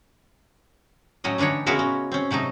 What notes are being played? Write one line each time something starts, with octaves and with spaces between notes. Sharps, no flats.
A2 F#3 C#4 D#5
D3 E3 D4 D#4 C#5
C#3 G#3 B3 E4 F#4 A#4
C#4
C4 C#4
C3 F#3 A3 D#4